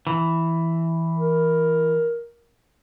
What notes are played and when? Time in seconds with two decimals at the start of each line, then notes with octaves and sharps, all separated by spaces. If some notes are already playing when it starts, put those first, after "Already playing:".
0.07 E3
1.17 A#4